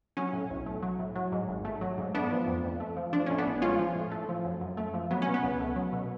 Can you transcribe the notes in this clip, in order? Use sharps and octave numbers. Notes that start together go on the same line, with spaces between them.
F#3 C#4
A2
B1
A3
F#3
A2
F#3
G#2
G#1
A3
F#3
G#2
A3 B3 D4
F3
F2
F2
A3
F3
F3 D4
A2 C#4
B3 D4
A1
G#3 C#4 F4
F3
A2
A3
F3
F#2
F#2
A3
F3
F#3 B3
C#4
B2
B3
C#2
A3
F#3
B2